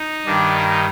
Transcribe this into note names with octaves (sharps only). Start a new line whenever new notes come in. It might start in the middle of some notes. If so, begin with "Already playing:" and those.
Already playing: D#4
G2 D#3 D4
D#4